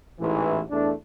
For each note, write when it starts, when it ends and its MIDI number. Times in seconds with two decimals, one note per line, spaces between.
0.19 0.61 33
0.19 0.61 44
0.19 0.61 52
0.70 0.91 40
0.70 0.91 57
0.70 0.91 62